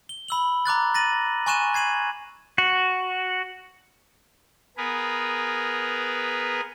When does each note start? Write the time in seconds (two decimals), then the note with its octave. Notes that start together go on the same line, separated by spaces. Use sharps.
0.09 G7
0.28 B5 E6 F#7
0.65 A#5 D6 F#6 A6
0.94 A6 A#6 D#7 F#7
1.46 G#5 C6 C#6 F#6 D#7 E7
1.74 G#6 C7 D#7 F#7
2.58 F#4
4.77 B3 G#4 A#4 B4